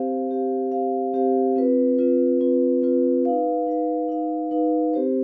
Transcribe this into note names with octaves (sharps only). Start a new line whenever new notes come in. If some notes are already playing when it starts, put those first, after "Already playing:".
Already playing: C4 G4 C5 F5
C4 G4 C5 F5
C4 G4 C5 F5
C4 G4 C5 F5
C4 F4 B4
C4 F4 B4
C4 F4 B4
C4 F4 B4
D#4 B4 F5
D#4 B4 F5
D#4 B4 F5
D#4 B4 F5
C4 G4 C5